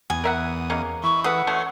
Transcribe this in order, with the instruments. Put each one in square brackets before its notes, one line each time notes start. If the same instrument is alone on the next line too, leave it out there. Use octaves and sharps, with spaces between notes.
[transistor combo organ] E2 D#6 [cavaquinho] G#5
[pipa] A#4 E5 F#5
G#3 A#3 C#4
[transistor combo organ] E3 E4 [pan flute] C#6
[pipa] G#4 A4 B4 [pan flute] F#5 [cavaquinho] D#6
[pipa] F#3 A3 A5 [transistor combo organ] C#4 C6